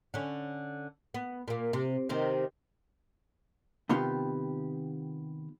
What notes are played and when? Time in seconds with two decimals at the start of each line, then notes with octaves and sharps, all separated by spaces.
0.14 D3 C#4
1.14 B3
1.48 A#2 A#3
1.73 C3
2.09 C3 D#3 C4
3.89 C3 D#3 B3 F4 G4